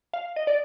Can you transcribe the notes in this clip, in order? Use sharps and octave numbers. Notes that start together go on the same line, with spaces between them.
F5
D#5
D5